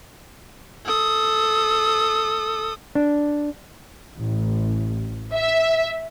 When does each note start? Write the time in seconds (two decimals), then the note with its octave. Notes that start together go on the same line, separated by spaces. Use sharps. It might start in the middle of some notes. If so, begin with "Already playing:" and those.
0.85 A4 D#6
2.95 D4
4.17 A1
5.33 E5